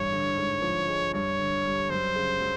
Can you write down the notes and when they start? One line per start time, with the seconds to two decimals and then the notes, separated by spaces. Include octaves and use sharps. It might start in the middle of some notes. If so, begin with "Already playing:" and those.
Already playing: A1 G2 C#5
0.12 D3
0.36 G#2
0.62 F3
0.87 G#3
1.13 G2 C#5
1.39 D3
1.64 G3
1.90 F#2 C5
2.15 C#3
2.41 F#3